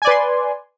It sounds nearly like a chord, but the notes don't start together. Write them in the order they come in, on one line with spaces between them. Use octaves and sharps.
G#5 D5 B4 C6